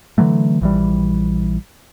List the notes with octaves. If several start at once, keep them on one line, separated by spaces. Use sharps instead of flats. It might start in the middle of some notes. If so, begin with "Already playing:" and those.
D3 E3 F#3 A3
A#1 E3 G3